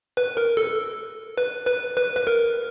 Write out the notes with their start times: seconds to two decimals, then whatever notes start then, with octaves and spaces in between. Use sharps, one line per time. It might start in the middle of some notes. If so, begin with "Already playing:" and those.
0.17 B4
0.37 A#4
0.57 A4
1.38 B4
1.67 B4
1.97 B4
2.16 B4
2.27 A#4